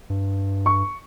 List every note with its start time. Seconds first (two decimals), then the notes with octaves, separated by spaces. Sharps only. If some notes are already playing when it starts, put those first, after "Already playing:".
0.10 G2
0.66 C#6